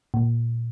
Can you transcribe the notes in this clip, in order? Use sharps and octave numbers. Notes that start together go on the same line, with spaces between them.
A#2